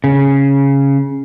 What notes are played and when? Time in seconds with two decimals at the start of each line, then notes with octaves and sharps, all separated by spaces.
0.04 C#3